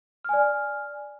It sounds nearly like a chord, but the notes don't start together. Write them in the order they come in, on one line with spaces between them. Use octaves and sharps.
F6 G#5 D5